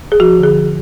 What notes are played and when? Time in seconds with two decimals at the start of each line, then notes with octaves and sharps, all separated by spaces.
0.12 G#4
0.20 F3 F#4
0.39 D3 G#4